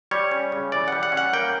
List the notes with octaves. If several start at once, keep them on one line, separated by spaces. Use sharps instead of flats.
G3 C#5
C#4
C#3
E3 D5
G3 F#5
F#5
C#4
F#5
A#3 G5